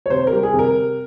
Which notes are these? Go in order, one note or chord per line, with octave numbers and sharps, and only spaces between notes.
C#5
C3 C5
A#4
G3
G#4
C3
A#4